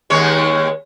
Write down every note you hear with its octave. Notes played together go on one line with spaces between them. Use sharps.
D#2 G#3 C#5